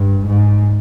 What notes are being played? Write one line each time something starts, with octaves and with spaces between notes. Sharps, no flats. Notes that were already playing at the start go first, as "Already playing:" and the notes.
Already playing: G2
G#2